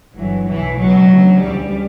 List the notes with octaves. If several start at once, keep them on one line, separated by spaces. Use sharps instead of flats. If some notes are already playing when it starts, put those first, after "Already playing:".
G1 G2 E3 F#3
B1 B2 E3
C#2 B2 F#3
D2 C#3 E3
D2 C#3 E3 G3